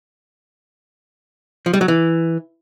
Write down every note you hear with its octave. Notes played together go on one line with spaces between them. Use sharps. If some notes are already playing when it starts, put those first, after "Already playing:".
F3
G3
F#3
E3